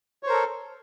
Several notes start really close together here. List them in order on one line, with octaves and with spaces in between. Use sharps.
C#5 C5 A#4 A4